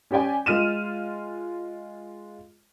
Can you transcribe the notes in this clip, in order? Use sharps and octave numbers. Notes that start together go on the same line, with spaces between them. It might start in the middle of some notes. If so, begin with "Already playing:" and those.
C#4 G4 D5 G5 G#5
G#3 F4 F6 D#7 E7